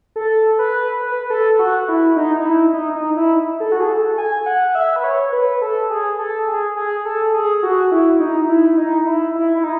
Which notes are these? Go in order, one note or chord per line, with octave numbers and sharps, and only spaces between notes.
A4
B4
B4
A4
F#4
E4
D#4
D#4
E4
D#4
D#4
E4
A4
F#4
G#4
A4
G#5
F#5
F#5
E5
B4
C#5
B4
A4
G#4
A4
G#4
G#4
A4
G#4
F#4
E4
D#4
E4
D#4
E4
E4
E4
D#4